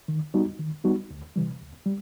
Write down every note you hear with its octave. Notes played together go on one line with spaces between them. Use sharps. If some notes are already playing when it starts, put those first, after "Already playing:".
D#3
G3 B3 D#4 F#4
D#3
G3 B3 D#4 F#4
D2
C3 E3 G3
D2
G3